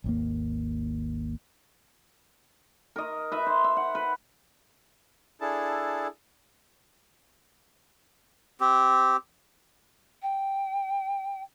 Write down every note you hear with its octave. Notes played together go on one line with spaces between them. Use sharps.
G#1 D#2 A#3
A#4 D#5
B4 E5
C5
E5
F#5
B4
D4 E4 G#4 A4 A5
C4 G4
G5